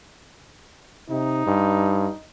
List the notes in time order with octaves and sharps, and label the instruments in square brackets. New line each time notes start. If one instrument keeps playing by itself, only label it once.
[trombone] C3 [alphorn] D#4
[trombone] G2